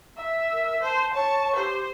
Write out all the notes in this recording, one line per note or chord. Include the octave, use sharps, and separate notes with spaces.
E5
A#4
C5 A5
C#5 A5 C#6
G4 C5